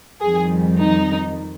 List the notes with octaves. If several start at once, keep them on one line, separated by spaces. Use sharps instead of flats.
F2 D#3 G3 G#4
D#4